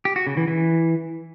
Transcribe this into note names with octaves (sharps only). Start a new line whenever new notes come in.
G4
F#4
C#3
E3
E3